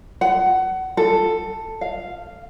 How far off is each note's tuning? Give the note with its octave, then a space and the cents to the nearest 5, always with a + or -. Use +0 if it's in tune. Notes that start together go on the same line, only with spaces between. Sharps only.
F#5 +20
A4 +10
F5 -5